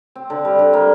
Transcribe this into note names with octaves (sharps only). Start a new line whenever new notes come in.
C4
D3
G3
D3
A#3